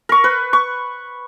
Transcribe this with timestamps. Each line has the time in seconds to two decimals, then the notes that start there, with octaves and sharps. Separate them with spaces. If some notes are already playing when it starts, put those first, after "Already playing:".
0.09 A#4 C#6
0.24 B4
0.53 C#6